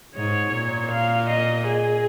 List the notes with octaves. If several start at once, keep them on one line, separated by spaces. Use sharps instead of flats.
G#2 C#5
A#2
F5
D#5
G#4